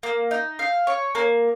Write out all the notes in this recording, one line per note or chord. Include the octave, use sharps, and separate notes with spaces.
A#3
D#4
F5
C#5
A#3